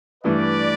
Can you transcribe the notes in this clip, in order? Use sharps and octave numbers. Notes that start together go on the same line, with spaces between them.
G2 E3 A3 B4 D5